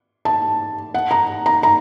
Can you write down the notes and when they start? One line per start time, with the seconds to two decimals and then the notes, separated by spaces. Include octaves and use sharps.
0.25 A5
0.94 F#5
1.11 A#5
1.46 A#5
1.63 A#5